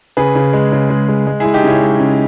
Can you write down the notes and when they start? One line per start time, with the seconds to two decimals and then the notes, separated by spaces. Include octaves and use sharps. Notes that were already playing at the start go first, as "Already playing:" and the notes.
0.17 C#3 G#4 B4
0.35 C#3
0.53 G#3
0.72 C#3
0.90 G#3
1.08 G#3
1.27 G#3
1.40 E4 G#4
1.45 G#3
1.54 D#4 G4
1.64 C#3 C#4 E4
1.82 G#3
2.00 C#3